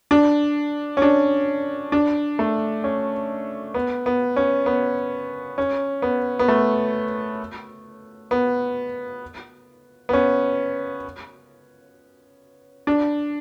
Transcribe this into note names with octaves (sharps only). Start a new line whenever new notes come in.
D4
C#4
D4
D4
A3
C#4
B3
B3
C#4
B3
C#4
B3
B3
A3
B3
B3
C#4
D4